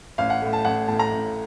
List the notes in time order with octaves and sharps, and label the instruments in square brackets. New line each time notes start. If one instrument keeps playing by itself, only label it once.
[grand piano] A1 F5
F#5
A2 A3
A5
A1 F#5
A2 A3 A5
A#5
A1